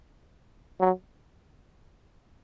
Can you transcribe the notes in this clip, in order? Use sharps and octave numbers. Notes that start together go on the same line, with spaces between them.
F#3